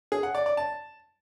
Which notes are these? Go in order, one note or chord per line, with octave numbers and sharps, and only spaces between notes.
G#4
F#5
D5
D5
A5